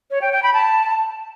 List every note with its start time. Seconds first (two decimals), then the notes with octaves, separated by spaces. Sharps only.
0.11 C#5
0.21 G5
0.32 G5
0.43 B5
0.53 A5